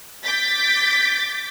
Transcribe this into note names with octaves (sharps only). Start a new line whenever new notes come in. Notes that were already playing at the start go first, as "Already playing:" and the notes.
D6 G6 A6 B6